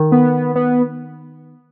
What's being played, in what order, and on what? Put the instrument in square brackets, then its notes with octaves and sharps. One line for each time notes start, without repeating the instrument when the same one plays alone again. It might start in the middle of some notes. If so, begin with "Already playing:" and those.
Already playing: [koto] D#3
[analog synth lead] B3
B3